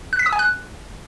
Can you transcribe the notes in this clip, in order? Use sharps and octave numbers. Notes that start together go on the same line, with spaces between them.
F#6
B6
D#6
G#5
F#6